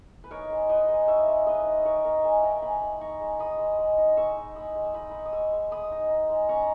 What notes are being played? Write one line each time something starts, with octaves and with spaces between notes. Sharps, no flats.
B4
D#4 A#4 C#5
G#3
D#4 B4 D#5
G#3
D#4 C#5 E5
G#3
G#3 B4 D#5
D#4
D#4 A#4 C#5
D#4 A#4 C#5
G#3 E5 G#5
G#3 G5 A#5
D#4 G#5 B5
G#3
D#4 A#5 C#6
G#3
D#4 B5 D#6
G#3
G#3
D#4
G#3 C#6 E6
D#4
G#3 B5 D#6
G#3
E6
D#4 B5 D#6
D#4 B5
C#6
D#6
G#3 C#6 E6
G#3
G#3 B5 D#6
D#4
D#4
G#3
C#4 A#5 C#6